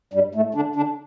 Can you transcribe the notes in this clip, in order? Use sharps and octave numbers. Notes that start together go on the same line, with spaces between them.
G2 G3
A2 A3
D3 D4
D3 D4